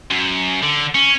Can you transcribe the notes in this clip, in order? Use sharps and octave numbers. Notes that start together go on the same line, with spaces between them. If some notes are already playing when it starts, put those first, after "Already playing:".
F#2
D3
C#4